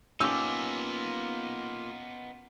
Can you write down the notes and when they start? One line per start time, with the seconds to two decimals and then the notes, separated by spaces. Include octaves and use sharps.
0.20 A#3 B3 C#4 D#4 F4 G4 D6 E6